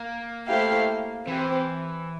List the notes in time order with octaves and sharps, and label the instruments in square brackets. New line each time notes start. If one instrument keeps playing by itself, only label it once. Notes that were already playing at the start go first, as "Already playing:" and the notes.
Already playing: [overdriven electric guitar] A#3
[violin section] A3 E4 G4 C5 F5
[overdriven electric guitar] E3 [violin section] C4 G4 C5